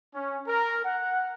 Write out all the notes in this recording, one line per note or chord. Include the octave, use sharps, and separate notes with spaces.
C#4
A#4
F#5